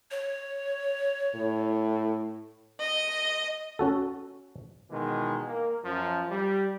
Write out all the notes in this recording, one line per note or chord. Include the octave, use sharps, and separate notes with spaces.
C#5
A2
D#5
C#4 F#4 A4
B2 D#3 E3 G#3
A#3
F#2 F3
G3